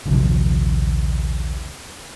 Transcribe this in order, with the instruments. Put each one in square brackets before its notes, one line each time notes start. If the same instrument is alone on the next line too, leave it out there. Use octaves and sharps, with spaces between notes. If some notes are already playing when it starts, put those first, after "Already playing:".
[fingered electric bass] A#1 D#2 C3 F3